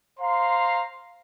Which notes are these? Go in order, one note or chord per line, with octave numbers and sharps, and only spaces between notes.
C5 F5 A#5 C6